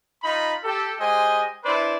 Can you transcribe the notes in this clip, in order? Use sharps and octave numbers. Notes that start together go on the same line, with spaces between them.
D#4 F4 B5
G4 A4
G#3 G4 C5 D#5 G#5
D4 E4 B4 C5 D5